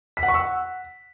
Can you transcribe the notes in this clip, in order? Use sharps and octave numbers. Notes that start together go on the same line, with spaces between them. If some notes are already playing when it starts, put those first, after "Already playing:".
B6
F#5
C#6
E6
F#5